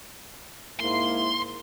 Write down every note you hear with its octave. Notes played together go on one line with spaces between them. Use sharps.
G#2 A#3 E4 C6